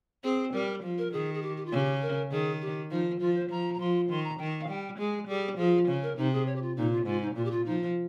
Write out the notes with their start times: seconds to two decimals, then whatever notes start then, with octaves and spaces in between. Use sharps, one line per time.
0.24 C4 G#4
0.53 G3 A#4
0.83 F3
0.98 A#4
1.12 D#3 G#4
1.34 G#4
1.42 G4
1.57 G4
1.66 F4
1.72 C#3 G4
2.02 A#4
2.31 D#3 G#4
2.62 G4
2.91 F3 D#4
3.20 F3 F4
3.35 C5
3.50 F3 A#5
3.74 A#5
3.80 F3 C6
4.10 D#3 C6
4.24 A#5
4.39 D#3 G5
4.61 F5
4.69 G3 G5
4.99 G#3 G#4
5.28 G3 G#4
5.58 F3 G#4
5.88 C#3
6.03 A#4
6.18 C3 D#4
6.33 G#4
6.47 C#5
6.56 G4
6.62 F4
6.77 A#2 D#4
6.92 F4
7.06 G#2 F4
7.21 D#4
7.36 A#2 F4
7.45 G4
7.51 F4
7.66 F3 D#4